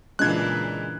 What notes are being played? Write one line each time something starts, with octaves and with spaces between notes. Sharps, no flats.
A#2 C#3 E3 G#3 D4 F4 F#6 G#6